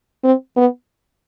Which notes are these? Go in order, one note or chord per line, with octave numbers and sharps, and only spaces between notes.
C4
B3